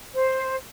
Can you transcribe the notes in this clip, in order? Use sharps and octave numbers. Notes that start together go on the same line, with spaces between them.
C5